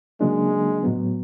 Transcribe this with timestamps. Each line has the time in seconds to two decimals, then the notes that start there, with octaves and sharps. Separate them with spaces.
0.21 C#3 F#3 G#3 A#3 D4
0.83 A2 F#3 B3